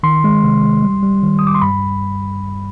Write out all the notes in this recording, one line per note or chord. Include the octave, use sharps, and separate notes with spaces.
D#3 C6
G#3
C3
G#3
G3
G3
D#3
D#6
G3
D6
C6
G2 B5